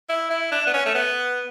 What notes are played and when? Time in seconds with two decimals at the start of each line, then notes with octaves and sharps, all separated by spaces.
0.09 E4
0.30 E4
0.52 D4
0.66 B3
0.73 C#4
0.86 A3
0.94 B3